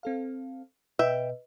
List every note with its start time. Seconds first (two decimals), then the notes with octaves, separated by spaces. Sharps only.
0.03 C4 A4 F5
0.99 B2 B4 D#5 E5 G5